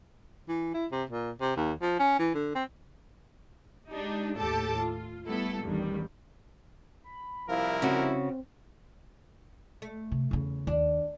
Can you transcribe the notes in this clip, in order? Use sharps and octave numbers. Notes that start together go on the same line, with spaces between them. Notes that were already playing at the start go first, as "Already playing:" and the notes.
E3
E4
C3
A#2
C3
D#2
F3
C#4
E3
D3
C4
G#3 D4 D#4 G4
D#2 A2 G4 A4 A5 D6
F4
G3 A3 B3 E4 A4
A1 E2 G2 D#3 G3
B5
C2 F3 E4 A#4 F5
C#3 C4 F#4
A3
C3
E2 C#3
D#2 D4